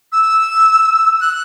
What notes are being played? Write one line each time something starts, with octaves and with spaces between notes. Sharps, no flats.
E6
F#6